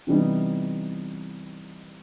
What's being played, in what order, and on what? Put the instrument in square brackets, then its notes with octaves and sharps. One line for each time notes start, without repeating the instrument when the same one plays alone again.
[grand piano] C3 E3 G3 B3 D#4